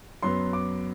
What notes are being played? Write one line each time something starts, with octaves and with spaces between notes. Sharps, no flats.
F#2 F#3 B3 C6
D6